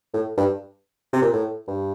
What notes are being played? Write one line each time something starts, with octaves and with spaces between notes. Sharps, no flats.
A2
G2
C3
A#2
A2
G2